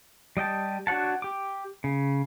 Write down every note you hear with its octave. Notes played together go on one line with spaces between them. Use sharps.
G3 D#5 G5 A5
D4 F#4 C#5 F#5 A5
G4 D6
C#3